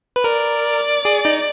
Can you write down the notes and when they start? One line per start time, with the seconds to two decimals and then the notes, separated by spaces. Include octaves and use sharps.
0.16 B4
0.24 A#4 D5
1.05 G#4
1.25 D#4